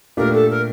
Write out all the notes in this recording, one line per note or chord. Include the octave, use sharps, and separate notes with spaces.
A#2 A3 D4 G4 A#4
A4
A#4